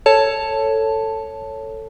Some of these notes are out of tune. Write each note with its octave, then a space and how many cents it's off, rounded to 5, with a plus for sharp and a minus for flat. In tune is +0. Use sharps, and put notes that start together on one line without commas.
A4 +15 C#5 +0 A5 +0